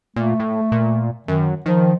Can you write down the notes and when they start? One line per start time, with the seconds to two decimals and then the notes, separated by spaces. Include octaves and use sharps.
0.16 A#2 A3
0.40 A2
0.72 A#2
1.28 F#2 D#3
1.66 D#3 F3